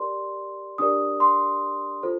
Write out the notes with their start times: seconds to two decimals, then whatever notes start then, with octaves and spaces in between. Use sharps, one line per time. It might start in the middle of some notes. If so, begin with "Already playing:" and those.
Already playing: G4 A#4 D5 C6
0.78 D4 G4 A#4 D5 D#6
1.20 C6
2.03 F4 A4 C5